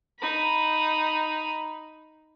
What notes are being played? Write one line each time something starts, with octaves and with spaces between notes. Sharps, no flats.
D#4 B5